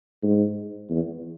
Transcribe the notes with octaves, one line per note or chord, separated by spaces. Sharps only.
G#2
E2